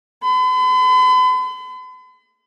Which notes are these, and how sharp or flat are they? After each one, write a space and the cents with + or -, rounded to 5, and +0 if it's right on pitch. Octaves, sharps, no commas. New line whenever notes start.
B5 +45